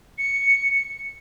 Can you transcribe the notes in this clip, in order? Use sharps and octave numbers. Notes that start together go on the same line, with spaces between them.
C#7